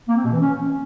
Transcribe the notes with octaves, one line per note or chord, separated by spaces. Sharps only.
A#3
C4
B2
E3
C#4